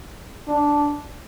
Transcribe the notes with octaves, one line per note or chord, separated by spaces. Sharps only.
D4